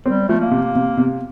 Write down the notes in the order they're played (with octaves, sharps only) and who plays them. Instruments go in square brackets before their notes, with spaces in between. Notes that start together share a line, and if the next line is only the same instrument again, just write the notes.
[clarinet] G3 [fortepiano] C4
[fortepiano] F3 [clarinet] A3
[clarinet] A#3
[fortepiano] C3
C3
C3